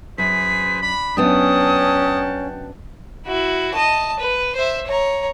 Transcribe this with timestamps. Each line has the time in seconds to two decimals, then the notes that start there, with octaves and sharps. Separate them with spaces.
0.18 F#2 G#4 B4 C5 B6
0.81 D4 B5
1.17 F#2 B3 C#4 D4 F#5 G5 A5 D#6
3.27 E4 F#4
3.74 D#5 A5
4.20 B4
4.55 C5 E5
4.87 C#5 A#5